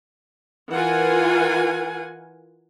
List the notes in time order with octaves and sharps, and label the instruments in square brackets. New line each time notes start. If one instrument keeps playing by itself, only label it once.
[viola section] E3 F4 A#4 F#5 G#5